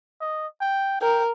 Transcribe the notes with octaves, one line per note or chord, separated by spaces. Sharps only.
D#5
G5
A#4 G5